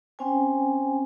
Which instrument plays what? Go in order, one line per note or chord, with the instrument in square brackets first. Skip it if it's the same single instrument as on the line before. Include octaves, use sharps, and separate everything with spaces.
[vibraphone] C4 C#4 C5 G5 G#5